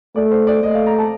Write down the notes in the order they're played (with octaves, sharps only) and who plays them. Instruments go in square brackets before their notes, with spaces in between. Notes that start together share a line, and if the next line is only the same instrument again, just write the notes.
[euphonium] A3 [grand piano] D5
[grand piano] C5
D5
[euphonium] A3 [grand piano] D#5
[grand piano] F5
A#5
A5